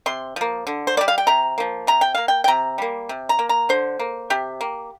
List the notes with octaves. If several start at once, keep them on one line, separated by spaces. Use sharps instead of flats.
C3 C6
F3 A#3
D3
C5
G3 A#3 D5
F5
G5
C3 A#5
F3 A#3
C3 A#5
G5
A#3 F5
G5
G5
C3 A#5
G3 A#3
C3
A#5
A#3
A#5
D3 C5
A#3
C3 G4
A#3